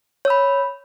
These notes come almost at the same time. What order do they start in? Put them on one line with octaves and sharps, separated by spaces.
C#5 E6 B5